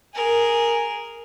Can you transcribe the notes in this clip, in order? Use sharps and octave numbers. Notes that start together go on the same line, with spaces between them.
G#4 A#4